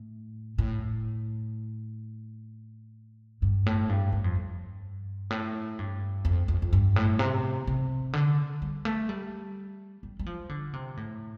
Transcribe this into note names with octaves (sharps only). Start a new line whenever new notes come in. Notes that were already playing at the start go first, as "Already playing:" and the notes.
Already playing: A2
A2
G2
A2
G2
G2
F2
G2
A2
G2
F2
F2
F2
G2
A2
C3
C3
D3
G3
A3
G3
G3
G3
F3
D3
C3
A2